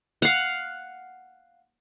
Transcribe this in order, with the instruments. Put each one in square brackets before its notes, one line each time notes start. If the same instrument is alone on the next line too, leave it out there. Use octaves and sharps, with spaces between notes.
[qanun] F5 F#5